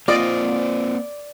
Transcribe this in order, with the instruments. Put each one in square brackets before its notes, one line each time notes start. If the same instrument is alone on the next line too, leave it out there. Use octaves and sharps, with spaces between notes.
[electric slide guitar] A#3 C4 C5 [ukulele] F4 D#5 [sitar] D5